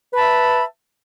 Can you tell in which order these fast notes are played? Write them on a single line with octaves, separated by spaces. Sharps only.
B4 B5 A5 E5